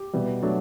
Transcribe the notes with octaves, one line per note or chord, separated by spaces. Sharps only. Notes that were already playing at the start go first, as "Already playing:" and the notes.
Already playing: G4
B2 E3 G3
F#3 A3 D4